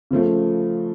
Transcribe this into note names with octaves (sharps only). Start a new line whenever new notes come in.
C#3 F3 A3